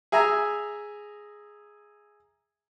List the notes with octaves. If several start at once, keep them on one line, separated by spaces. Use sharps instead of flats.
G#4 E5 G#5 A#5